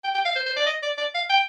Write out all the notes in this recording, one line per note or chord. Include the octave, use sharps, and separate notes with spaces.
G5
G5
F5
C5
C5
D5
D#5
D5
D5
F5
G5